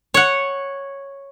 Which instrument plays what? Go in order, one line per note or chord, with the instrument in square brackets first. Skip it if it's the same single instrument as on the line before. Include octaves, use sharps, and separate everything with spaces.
[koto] C#5 F#5